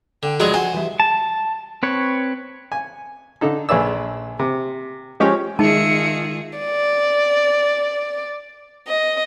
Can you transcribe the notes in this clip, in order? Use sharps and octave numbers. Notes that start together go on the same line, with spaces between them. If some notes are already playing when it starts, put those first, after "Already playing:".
D3 G5
G2 F3 F#3 G#3 F#4 G#4 D5
C5 F#5 G#5
E3 G3 E5
A5
C4 B4 C#5
G#5
D3 D#4 A4
A#1 G#4 B4 D5 E6
C3
F3 G#3 C#4 G4 C#5
D#3 G#3 D#4 F4 G#4 E5 A5 C#7
D5
D#5